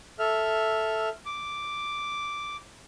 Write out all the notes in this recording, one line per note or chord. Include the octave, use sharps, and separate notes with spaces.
A4 E5 F6
D6